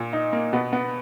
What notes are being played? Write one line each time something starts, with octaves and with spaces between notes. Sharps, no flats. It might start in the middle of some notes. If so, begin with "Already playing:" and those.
Already playing: A#2
D#4
A#3
B2 B3
B3